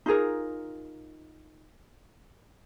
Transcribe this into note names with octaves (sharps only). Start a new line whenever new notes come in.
D#4 F4 G#4 A#4